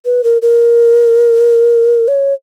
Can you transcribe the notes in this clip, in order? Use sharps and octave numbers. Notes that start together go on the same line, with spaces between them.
B4
A#4
A#4
C#5